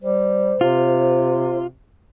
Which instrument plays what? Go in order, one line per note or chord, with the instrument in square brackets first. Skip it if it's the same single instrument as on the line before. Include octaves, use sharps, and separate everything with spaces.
[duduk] G3 [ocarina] C5
[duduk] C3 [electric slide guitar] F4